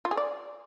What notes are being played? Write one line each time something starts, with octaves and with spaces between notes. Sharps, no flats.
F4
G#4
D5